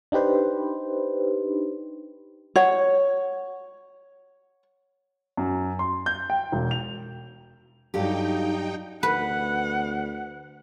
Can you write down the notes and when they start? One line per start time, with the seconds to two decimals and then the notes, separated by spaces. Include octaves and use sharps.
0.12 D4 D#4 G4 B4 C5
2.56 C#5 F#5
5.37 F#2
5.79 C6
6.06 G6
6.30 G5
6.52 E1
6.71 F7
7.94 G2 F#3 D#4 F#4 G4 A4 F5 G5
9.03 D2 B4 F#5